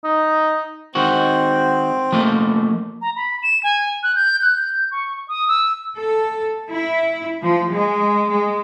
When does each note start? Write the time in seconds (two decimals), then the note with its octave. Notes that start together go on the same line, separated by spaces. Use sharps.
0.04 D#4
0.95 D#3 G#3 C4 F#4
2.12 F3 A3 A#3
3.02 A#5
3.16 B5
3.43 E7
3.63 G#5
4.03 F#6
4.16 G6
4.42 F#6
4.57 G6
4.91 C#6
5.28 D#6
5.48 E6
5.97 A4
6.70 E4
7.42 F3
7.72 G#3
8.30 G#3